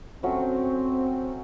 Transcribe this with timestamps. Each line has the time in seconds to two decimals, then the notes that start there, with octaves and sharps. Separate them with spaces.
0.23 F#3 A3 C4 C#4 F#4